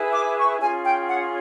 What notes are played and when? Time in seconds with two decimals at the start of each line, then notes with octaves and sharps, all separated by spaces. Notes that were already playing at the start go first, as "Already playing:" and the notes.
Already playing: E4 G#4 B4
0.13 D6
0.37 C#6
0.59 C#4 F4 G#4 G#5
0.84 G5
1.07 F#5